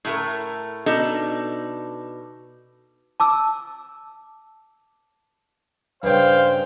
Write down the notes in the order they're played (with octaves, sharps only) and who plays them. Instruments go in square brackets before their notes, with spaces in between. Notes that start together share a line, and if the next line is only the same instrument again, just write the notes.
[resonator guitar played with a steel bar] A2 A3 A#4
B2 D4 D#4 A4
[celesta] A5 D6 E6
[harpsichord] G2 C#3 [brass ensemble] C5 [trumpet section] F5 G5